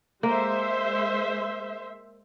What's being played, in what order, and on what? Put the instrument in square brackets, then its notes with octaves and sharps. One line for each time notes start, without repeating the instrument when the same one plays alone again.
[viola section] G#3 C5 E5 [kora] A#3